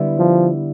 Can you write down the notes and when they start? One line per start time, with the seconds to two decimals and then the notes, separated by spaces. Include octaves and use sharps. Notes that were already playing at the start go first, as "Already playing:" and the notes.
Already playing: D3 G3 B3 E4
0.19 F3